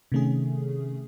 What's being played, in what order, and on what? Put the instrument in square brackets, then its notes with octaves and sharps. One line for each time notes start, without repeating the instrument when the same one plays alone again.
[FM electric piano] C3 D#3 A3 C#4 G#4